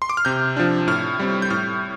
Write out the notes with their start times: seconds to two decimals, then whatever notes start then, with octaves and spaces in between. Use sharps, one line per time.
0.02 C6
0.09 D6
0.17 F6
0.25 C3 G6
0.57 F3 D4
0.87 A2 F6
1.19 G3 C4
1.42 G6
1.50 A2 F6